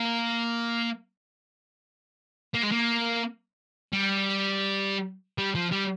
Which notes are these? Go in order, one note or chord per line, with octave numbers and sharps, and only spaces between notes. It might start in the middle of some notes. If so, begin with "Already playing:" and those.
Already playing: A#3
A#3
G#3
A#3
G3
G3
F3
G3